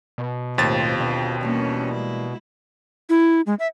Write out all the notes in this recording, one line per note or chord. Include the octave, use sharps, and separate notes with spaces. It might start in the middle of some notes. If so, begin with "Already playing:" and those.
B2
D#2 A2 C4 F4 G4 C5 A6
B2 D3
E3 G3 A#3 C#4 D4
G#3 E4
E4
G#3
E5